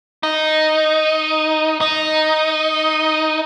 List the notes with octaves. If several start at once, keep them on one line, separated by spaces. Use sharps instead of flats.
D#4
D#4